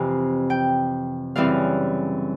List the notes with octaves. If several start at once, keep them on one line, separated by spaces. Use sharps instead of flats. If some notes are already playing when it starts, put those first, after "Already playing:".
Already playing: F2 C3 E3 G#5
G5
F#2 C#3 E3 G3 C4 F5